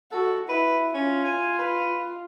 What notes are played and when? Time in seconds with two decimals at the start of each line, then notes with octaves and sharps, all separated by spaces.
0.12 F#4 A4
0.49 E4 B4
0.94 C#4 F4
1.25 G#5
1.59 B4